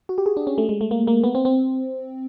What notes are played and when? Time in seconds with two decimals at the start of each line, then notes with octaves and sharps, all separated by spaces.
0.09 F#4
0.18 G4
0.26 G#4
0.37 D4
0.47 C#4
0.58 A3
0.69 G#3
0.81 A3
0.91 A#3
1.07 A#3
1.24 B3
1.35 C4
1.45 C4